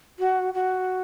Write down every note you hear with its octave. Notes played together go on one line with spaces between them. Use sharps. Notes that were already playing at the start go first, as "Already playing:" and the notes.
F#4
F#4